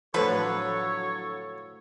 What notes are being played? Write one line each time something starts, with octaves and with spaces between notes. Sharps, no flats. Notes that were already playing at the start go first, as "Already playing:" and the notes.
A2 D3 F3 F#3 A4 B4 C#5